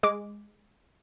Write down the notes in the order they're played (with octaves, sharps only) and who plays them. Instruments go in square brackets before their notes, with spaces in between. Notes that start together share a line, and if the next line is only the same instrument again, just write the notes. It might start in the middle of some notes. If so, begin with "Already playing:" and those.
[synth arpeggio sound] G#3 D6